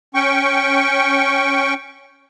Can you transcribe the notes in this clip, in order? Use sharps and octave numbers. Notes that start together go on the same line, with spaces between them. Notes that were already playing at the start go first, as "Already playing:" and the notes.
C#4 G5 C#6